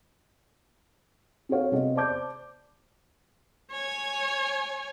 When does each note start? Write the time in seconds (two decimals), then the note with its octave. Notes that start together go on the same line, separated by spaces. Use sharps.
1.49 C4 F#4 G#4 A4 C#5 F5
1.72 C3 B3 C4 G#4 D#5
1.95 C5 D5 A5 D6 G6
3.71 C#5 G#5